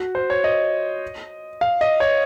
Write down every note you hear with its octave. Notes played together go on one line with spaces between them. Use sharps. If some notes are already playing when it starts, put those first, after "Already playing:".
Already playing: F#4
C5
C#5
D#5
F5
D#5
C#5